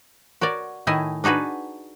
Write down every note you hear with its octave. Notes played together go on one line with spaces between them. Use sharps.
F#4 A#4 C#5 D5
A2 D#3 A3 E4 D#5 G#5
D4 D#4 F#4 G#4 B4